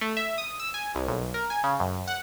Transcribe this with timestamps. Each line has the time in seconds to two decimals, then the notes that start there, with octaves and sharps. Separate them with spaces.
0.01 A3
0.17 E5
0.38 D#6
0.60 E6
0.74 G#5
0.95 C2
1.08 B1
1.34 A#4
1.50 G#5
1.64 C#3
1.80 F#2
2.08 F#5